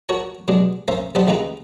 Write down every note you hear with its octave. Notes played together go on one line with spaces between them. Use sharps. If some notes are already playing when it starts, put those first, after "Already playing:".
F#4 A#4 C#5 A5
B2 F#3 G#3 D4
C#4 A#4 C5 E5 F5
B1 G3 D#4 B4 C5 A5
C#2 D#3 G#3 F4 B4 A#5